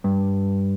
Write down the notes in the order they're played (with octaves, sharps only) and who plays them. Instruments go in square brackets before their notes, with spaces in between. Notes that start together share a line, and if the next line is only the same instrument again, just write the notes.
[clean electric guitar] G2